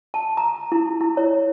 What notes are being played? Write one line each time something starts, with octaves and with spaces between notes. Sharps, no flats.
A5
A#5
E4
E4
C#5